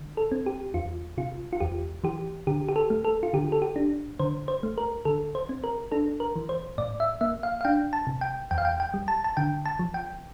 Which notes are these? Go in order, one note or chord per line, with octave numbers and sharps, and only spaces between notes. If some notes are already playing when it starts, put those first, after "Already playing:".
Already playing: D3
A4
C4
G4
E2 F4
C3 F4
F4
E2 G4
E3 G4
D3 G4
G4
A4
A3
A4
F4
D3 G4
A4
G4
D4
D3 C5
C5
A3
A#4
D3 A4
C5
C4
A#4
D4 A4
A#4
E3
C5
A2 D5
E5
A#3 E5
F5
F5
D4 G5
A5
C3
G5
E2 G5
F5
G5
G5
G3
A5
A5
D3 G5
A5
F3
G5